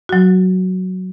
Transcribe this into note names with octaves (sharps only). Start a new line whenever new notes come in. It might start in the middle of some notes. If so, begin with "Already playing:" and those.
F#3 F#4